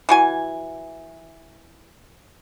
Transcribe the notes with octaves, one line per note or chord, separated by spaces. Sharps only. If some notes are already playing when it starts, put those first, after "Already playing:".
E3 F#4 G#5